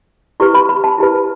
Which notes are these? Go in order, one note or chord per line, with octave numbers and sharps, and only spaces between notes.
E4 G4 B4 C#6
B5
B5
A5
E4 G4 B4